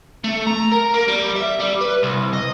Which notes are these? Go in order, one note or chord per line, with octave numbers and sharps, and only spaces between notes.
A3
A#5
A#4
A#3
G3
E5
G3
B4
C2
D#5